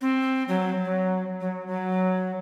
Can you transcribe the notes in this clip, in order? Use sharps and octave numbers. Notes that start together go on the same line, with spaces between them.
C4
F#3
F#3
F#3
F#3